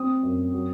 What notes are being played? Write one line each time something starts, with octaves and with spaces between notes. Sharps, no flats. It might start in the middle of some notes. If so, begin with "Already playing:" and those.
Already playing: C4 D#6
F#2
F#3